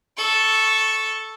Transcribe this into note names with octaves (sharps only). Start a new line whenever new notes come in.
A4 C#6